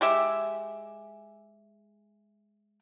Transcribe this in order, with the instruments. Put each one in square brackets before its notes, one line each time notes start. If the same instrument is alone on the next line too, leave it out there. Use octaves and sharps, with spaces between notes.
[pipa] G#3 G4 E5